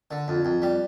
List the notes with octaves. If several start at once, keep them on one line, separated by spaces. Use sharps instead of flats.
D3
F2
F2
G3